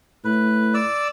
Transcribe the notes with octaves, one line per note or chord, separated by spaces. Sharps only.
A2 B4
D5 E6